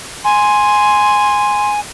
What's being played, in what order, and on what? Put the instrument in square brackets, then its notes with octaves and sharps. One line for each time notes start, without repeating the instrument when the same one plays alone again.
[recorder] G#5 [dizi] C6